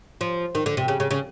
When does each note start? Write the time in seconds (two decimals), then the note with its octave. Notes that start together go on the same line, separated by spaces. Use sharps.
0.21 F3
0.55 D#3
0.66 D3
0.77 C3
0.88 C#3
1.00 C#3
1.11 C#3